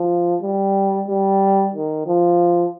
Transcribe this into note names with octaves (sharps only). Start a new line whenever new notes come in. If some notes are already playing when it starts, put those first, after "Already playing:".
Already playing: F3
G3
G3
D#3
F3